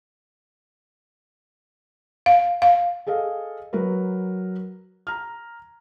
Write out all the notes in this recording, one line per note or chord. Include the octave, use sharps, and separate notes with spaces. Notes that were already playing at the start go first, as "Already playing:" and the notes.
F5
F5
G#4 A4 D#5 F5
F#3 F#4 A#4 B4
A#5 F6